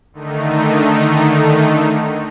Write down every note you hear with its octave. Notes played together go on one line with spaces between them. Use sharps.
D3 D#3 A3 D#4